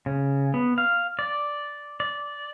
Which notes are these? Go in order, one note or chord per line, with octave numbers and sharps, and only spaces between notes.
C#3
B3
F5
D5
D5